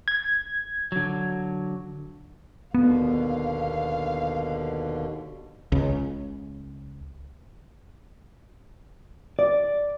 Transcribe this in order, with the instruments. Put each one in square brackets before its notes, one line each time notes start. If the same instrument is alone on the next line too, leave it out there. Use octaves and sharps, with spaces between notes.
[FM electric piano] G#6
[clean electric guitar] D3 F#3
[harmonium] D#2 B2 D3 [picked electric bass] B3 [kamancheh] F5
[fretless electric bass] C#2 C#3
[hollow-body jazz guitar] D5